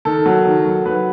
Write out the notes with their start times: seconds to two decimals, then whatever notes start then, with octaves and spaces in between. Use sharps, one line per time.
0.05 D#3 A4
0.26 F#3
0.45 D#3
0.65 F#3
0.86 F#3 B4